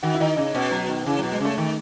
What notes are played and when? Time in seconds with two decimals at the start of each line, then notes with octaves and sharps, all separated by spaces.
0.03 D#3 F#4
0.14 E4
0.20 D#3 D#4
0.36 C#3 D#4
0.54 B2 C#4
0.71 F#3
0.88 D#3
1.06 C#3 E3
1.18 B2 F#3
1.31 G#3
1.40 C#3 A3
1.57 D#3 A3